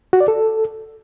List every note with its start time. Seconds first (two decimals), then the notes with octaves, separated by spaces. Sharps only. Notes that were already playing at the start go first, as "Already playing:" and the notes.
0.13 F#4
0.21 D5
0.28 A4